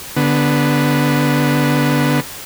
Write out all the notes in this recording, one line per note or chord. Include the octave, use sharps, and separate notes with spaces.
D3 B3